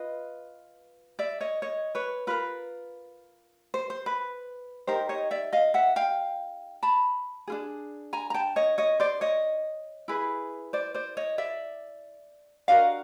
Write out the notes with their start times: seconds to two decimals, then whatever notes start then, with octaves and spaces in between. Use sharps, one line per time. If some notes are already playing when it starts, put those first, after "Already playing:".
Already playing: F4 B4 D#5
1.19 D5 E5
1.40 C#5 D#5
1.62 C#5 D#5
1.95 B4 C#5
2.27 F4 A#4 B4
3.74 C5
3.90 C5
4.06 B4
4.87 D#4 G4 A#4 C5
5.09 C#5 D#5
5.31 D5 E5
5.53 D#5 F5
5.74 E5 F#5
5.96 F5 G5
6.83 A5 B5
7.47 D4 F4 G#4
8.13 G#5 A#5
8.30 A#5
8.34 G5 A5
8.56 C#5 D#5
8.78 C#5 D#5
9.00 C5 D5
9.21 C#5 D#5
10.08 E4 G#4 B4
10.73 C5 D5
10.94 C5 D5
11.17 C#5 D#5
11.38 D5 E5
12.68 D4 F#4 A#4 D#5 F5